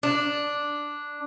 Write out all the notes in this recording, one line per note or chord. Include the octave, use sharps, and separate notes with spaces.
D4